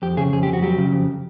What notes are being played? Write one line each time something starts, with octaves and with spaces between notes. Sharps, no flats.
F2 G4
C#3 G#4
F2 G#4
F2 G4
F#4
F#3 G4
C#3
F2